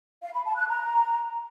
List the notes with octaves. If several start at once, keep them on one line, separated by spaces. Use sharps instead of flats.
F5
B5
A5
F#6
A#5